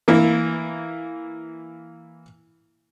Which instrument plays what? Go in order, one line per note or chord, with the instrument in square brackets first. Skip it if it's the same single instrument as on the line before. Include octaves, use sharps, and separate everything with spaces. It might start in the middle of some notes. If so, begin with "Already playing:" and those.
[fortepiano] E3 A#3 E4